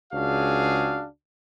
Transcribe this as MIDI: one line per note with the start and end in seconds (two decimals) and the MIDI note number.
0.13 1.05 37
0.13 1.05 62
0.13 1.05 66
0.13 1.05 68
0.13 1.05 77